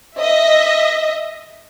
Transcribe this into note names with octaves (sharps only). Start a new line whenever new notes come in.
D#5 E5